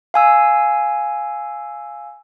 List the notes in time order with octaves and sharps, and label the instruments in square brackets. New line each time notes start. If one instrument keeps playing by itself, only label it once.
[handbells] F5 G#5 E6